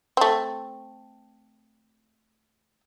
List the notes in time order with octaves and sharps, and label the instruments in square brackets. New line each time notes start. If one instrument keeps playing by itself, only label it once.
[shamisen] A3 C4